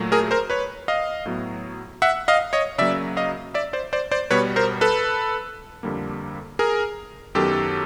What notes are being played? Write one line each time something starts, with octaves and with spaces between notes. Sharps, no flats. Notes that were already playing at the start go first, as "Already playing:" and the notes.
Already playing: A#2 F#3 A3
G#4 A#4
A#4 C5
B4 C#5
D#5 F5
A2 F#3 B3
E5 F#5
D#5 F5
C#5 D#5
C#3 F#3 A#3 D5 E5
D#5 F5
D5 E5
C5 D5
C5 D5
C5 D5
B2 G3 B3 B4 C#5
A#4 C5
A4 B4
F2 D3 G3 A#3
G#4 A#4
F#2 D#3 F#3 B3 G4 A4